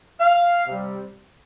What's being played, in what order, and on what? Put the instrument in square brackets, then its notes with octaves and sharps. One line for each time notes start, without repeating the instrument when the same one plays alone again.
[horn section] F5
C3 G3